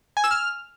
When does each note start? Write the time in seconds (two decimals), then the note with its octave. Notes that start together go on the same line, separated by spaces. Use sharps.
0.17 G#5
0.24 E6
0.31 F6